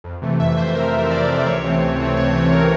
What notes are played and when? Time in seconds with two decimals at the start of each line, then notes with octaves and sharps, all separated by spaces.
0.04 F2
0.22 C3 E3 A3
0.40 F2 E5
0.57 C3 E3 A3 C5
0.75 F2 A#4
0.93 C3 E3 A3
1.11 F2 D5
1.28 C3 E3 A3
1.47 C#2 C#5
1.64 C3 E3 A3 C4
1.82 C#2
1.99 C3 E3 A3 C4
2.17 C#2 C#5
2.35 C3 E3 A3 C4
2.52 A#4